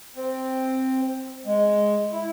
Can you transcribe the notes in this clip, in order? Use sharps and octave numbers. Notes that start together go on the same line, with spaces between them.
C4
G#3
E4